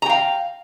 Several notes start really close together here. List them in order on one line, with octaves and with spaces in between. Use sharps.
A#5 G5 F5